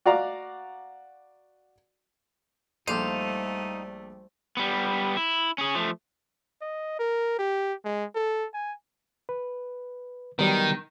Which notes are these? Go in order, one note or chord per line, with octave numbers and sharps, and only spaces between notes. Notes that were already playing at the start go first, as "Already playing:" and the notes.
F#4 D5 F5 A#5 D6
A#1 G3 A3 D#4 A4 C5 F5 D6
G3 B3
E4
C#4 G#4
F3 A3
D#5
A#4
G4
G#3
A4
G#5
B4
D#3 F#3 G3 B3